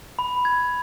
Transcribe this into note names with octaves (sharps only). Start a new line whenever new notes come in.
B5
G#6